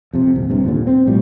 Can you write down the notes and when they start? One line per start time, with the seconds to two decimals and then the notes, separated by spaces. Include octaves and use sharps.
0.13 F2 C3
0.34 D#1 C2
0.48 A#1 G2 C3
0.64 D#2 A#2 D3
0.87 C4
1.06 B1 A2 F3 G3